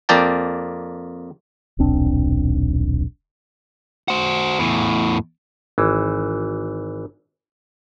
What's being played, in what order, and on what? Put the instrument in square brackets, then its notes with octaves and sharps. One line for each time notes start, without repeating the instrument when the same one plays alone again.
[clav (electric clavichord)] F2 A#3 D5 G5 A5
[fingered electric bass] D#1 B1 C4 D4
[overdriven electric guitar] F#4 C5
E2 A2
[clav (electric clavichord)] G#1 E3